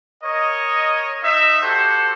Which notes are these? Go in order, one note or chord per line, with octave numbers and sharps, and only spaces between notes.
A#4 C#5 D#5
D#4 D#5 E5
F#4 G4 A4 C5